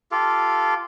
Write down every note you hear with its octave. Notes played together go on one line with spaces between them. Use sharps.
F4 G4 A4 F5